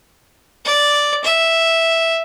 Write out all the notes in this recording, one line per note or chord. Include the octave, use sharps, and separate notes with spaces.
D5
E5